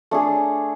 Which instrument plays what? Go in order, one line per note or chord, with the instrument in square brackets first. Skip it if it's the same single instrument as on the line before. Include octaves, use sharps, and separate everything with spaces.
[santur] A3 D4 G#4